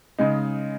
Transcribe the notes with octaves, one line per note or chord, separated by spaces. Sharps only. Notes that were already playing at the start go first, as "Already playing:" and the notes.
C#3 G#3 D#4